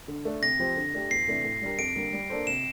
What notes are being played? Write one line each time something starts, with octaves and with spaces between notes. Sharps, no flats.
D3
A3 D4
C3 A#6
F3 C4 G4 C5
D3
A3 D4 G4
E2 C7
C3 E3 A3 D4
A2
G3 D4 G4 A#4
F2 D7
D3 G3 A#3
G3
A#3 D4 A4 C5
C3 E7